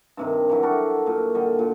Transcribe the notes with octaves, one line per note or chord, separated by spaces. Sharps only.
G2 C3 D#3
E3 F#3 E4 G4
F#4 A4 A#4 D6
A#2
D3 G3 D#5
A#2